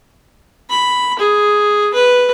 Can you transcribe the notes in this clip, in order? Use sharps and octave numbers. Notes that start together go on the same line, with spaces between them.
B5
G#4
B4